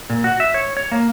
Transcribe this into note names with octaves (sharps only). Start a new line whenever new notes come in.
A#2
F#4
E5
C#5
C#5
A#3